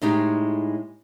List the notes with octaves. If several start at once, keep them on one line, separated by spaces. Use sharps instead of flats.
A2 G#3 D#4 G4